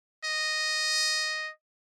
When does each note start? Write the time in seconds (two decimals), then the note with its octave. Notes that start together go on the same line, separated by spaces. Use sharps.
0.24 D#5